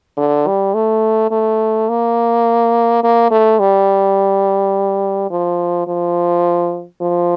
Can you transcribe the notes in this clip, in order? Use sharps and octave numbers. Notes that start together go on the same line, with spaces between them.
D3
G3
A3
A3
A#3
A#3
A3
G3
F3
F3
F3